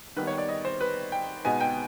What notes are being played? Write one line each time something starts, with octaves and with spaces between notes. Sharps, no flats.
D#3 G3 B3 B4
C#5
D5
D#5
C5
B4
G5
B2 G#3 B3 D#4 G#5
G5